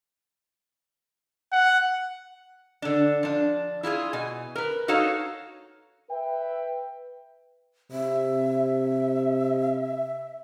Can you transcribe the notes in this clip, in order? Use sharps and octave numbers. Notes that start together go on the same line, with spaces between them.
F#5
D3 D4
F3 D4
E4 F4 G4 G#4
B2 G#5
A#4 B4
D#4 F#4 A4 C#5 F5
B4 E5 G5
C3 E5